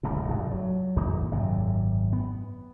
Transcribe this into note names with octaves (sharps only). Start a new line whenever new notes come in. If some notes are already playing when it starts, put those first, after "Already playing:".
D1 C#2 F#2 B2
F1 G2
F#3
G#1 E2 A#3
G#1 F#2 C3
B3